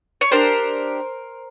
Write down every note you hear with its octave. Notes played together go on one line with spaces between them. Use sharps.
C#5
D4 G4 A#4 C5